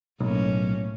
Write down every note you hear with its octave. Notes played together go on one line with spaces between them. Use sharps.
B1 A2 A#3 C#4